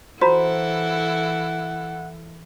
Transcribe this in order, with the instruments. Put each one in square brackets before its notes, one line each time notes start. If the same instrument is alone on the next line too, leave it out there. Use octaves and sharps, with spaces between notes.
[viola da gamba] E3 E4 A4 [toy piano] F#4 A#5 B5 [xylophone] C5 [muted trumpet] F#5